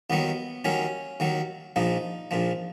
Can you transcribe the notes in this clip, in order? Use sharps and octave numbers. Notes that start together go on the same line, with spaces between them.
D#2 D#3 F#3 B3
D#2 D#3 F#3 C#4
D#2 D#3 F#3
A#1 A#2 F3 D#4
A#1 A#2 F3